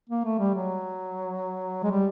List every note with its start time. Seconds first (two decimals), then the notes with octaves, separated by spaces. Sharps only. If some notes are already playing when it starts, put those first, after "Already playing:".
0.10 A#3
0.24 A3
0.39 G3
0.55 F#3
1.84 G#3
1.91 G3